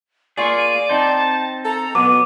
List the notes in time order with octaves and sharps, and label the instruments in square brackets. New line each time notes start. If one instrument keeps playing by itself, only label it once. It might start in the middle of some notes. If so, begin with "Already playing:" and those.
[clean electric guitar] A#3 F4 G#4 [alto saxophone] D5 [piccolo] C#6
[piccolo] D#7
[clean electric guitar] C4 D#4 C5 [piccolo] A5
[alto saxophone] A4 [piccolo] A#5
[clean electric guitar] B2 F#3 [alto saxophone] B3 [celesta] D6 [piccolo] D#7